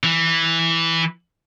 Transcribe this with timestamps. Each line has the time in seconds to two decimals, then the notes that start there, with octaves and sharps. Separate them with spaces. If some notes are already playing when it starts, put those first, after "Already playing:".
0.03 E3